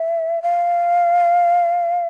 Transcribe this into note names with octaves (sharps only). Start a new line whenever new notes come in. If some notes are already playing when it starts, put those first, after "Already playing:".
Already playing: E5
F5